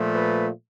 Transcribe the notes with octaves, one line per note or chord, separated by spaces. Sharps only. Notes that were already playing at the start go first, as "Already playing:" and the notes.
Already playing: A#2 F3 A3
B4